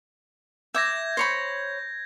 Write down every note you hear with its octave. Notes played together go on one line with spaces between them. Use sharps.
E5 D6 G6 G#6 A#6
C5 C#5 B5